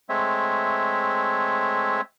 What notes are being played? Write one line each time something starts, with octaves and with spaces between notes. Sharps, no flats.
G#3 A3 C4 C#5 E5